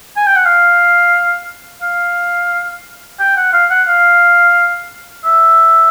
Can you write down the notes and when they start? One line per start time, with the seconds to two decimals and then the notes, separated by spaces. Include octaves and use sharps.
0.17 G#5
0.27 G5
0.36 F#5
0.46 F5
1.82 F5
3.20 G5
3.37 F#5
3.53 F5
3.70 F#5
3.87 F5
5.25 E5